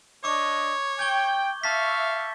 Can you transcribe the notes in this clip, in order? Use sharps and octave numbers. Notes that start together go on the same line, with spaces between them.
D4 C#5 D#5 C#6 D6
G5 G6 G#6 G7
E5 F5 A5 C#6 A6 B6